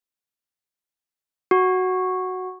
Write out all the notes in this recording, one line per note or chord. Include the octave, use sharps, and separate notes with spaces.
F#4